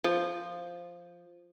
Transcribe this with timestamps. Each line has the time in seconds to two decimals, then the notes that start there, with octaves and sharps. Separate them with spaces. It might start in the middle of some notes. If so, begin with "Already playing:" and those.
0.04 F3